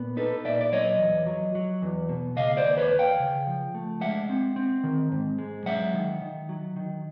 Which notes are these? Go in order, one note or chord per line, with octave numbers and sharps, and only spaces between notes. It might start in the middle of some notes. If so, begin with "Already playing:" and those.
Already playing: A#2 B3
D#4 A4 B4
A#2 D5 E5
D5
F#3 C#5 D#5
E2
F#3
F#3
E2
B2
C#3 D#5 F5
C5 D5
D#2
B4 C#5
D#2
F5 G5
C#3
F3
A3
G#3 E5 F#5
C4
C4
D#3
G#2
G#3
F#3 E5 F#5
D#3
D#3
F#3
D#3